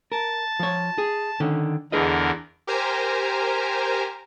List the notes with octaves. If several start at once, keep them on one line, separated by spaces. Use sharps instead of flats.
A#4 A5
F3 C#5
G#4
D3 D#3 C#4
E2 D3 G#4 A#4 B4 D#5
G4 A#4 C5 G#5 A#5